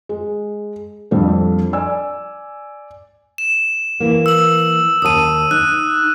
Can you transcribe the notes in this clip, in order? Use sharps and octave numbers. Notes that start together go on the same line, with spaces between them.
G#3
F2 G3 C4 D4 A4
D5 G#5 E6
E7
E3 A#3
E6 F#7
D#2 A5 D#6 D#7
D#4 F#6